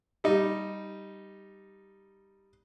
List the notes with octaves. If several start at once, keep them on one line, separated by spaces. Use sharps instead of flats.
G3 D#4